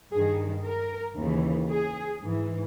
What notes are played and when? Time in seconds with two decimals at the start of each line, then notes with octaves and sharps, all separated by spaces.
0.12 G2 D#3 G#4
0.65 A#4
1.17 D#2 C#3 E3
1.70 G#4
2.23 G#2 E3